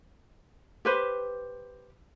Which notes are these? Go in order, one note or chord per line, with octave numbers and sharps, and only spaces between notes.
G4 B4 C5